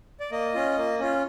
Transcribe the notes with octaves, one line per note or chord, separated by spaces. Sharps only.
D5
A#3 D#5
C#4 F4
A#3
C#4 F4